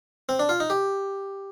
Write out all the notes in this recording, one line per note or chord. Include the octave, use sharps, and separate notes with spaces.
C4
D4
F4
D#4
G4